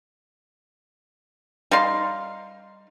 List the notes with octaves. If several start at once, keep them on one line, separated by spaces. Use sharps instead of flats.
G3 D#4 F5 C6